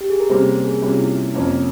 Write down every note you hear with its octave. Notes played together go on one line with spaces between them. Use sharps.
G4
G#4
A#4
C3 G3 A#3 C#4 C5
A#4
G#4
C3 G3 A#3 C#4 F4
E4
F2 C3 F3 A#3 C#4